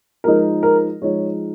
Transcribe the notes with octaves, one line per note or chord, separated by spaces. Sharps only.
F3 G#3 D#4 A#4
A#4
F3 G#3 D#4 C#5